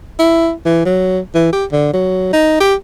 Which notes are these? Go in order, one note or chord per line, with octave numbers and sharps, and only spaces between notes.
E4
E3
F#3
E3
G4
D3
F#3
D#4
G4